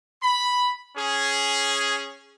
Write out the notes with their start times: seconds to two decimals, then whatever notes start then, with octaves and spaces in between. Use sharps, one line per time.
0.22 B5
0.96 C#4 G#4